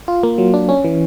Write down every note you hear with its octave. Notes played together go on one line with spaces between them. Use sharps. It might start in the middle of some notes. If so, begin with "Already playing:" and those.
F4
A#3
F#3
D4
C#4
E3